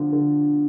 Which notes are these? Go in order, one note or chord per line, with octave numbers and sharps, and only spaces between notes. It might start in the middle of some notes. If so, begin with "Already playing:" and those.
Already playing: D3 F3
D3